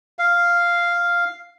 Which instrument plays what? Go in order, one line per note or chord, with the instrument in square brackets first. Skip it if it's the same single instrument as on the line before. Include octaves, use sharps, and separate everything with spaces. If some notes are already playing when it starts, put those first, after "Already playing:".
[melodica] F5